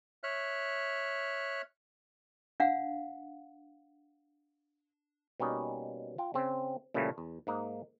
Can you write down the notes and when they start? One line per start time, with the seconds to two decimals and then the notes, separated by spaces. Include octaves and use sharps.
0.23 C#5 E5 F6 F#6
2.60 D4 F5 F#5
5.40 B2 G3 A#3 C#4 D#4
6.18 F4 G5
6.34 C#3 C4
6.94 A#2 C#3 E3 F3 G3 A3
7.18 E2
7.47 G#2 A#3 D#4